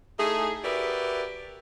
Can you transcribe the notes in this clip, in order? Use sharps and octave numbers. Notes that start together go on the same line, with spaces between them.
A3 D#4 E4 G#4
F#4 G4 A#4 B4 D5 E5